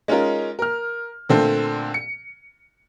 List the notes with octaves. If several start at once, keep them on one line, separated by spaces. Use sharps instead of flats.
G#3 C#4 D#4 F4 A#4
A#4 F6
A#2 D3 A3 C4 A4
C#7